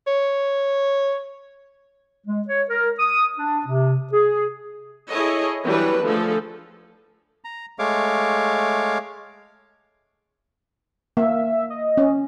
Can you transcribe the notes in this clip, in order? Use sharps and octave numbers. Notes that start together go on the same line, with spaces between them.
C#5
G#3
C#5
A#4
D#6
D4
C3
G#4
E4 G#4 A4 C#5 D#5
E3 F#3 G3 D4 B4
D3 F3 A3 G#4 A4
A#5
G#3 A3 C#5 F5 D6
A#3 E5
D#5
C#4